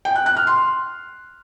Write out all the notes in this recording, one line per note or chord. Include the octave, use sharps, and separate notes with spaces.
G5
F#6
F#6
F6
C6